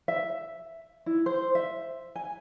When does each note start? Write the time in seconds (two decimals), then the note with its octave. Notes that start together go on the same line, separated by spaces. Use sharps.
0.08 E5
1.06 E4
1.26 C5
1.55 E5
2.16 G#5